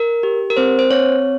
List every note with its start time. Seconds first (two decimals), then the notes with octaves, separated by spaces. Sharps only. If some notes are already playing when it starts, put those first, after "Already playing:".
Already playing: A#4
0.23 G4
0.50 A#4
0.57 C4 C5
0.79 C5
0.91 C4 C#5